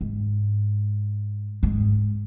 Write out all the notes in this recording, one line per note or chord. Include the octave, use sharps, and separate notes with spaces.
G#2
G#2